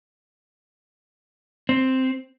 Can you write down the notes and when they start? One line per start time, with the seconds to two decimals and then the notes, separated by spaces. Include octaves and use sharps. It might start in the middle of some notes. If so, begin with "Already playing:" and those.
1.69 C4